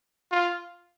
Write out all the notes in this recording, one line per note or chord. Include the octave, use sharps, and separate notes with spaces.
F4